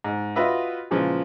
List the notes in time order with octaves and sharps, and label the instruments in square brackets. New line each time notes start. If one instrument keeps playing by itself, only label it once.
[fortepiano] G#2
F4 F#4 B4 D#5 E5
A#2 C#3 E3 F3 G#3